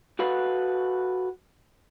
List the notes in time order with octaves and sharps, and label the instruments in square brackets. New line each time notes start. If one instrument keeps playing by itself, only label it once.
[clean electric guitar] F#4 A4 B4 F5 F#5